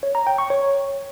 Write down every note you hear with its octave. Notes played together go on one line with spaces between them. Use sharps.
C#5
A#5
G5
C#6
C#5